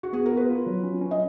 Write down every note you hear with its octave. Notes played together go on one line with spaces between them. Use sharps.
F#4
B3 G#4
A#4
F4
B4
F4
F#3
C#4
C#4
D#5